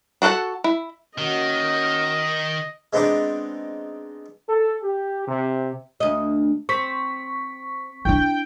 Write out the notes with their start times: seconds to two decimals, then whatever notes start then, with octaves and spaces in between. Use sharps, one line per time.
0.22 D4 F#4 A4 F#5 A5
0.64 E4
1.18 D#3 A#3 C#4 F#4 D#5
2.93 G#3 B3 C4 D4 D#4 D5
4.49 A4
4.83 G4
5.26 C3
6.00 D2 D#5
6.69 C4 C#6 B6
8.05 D4 E4 G5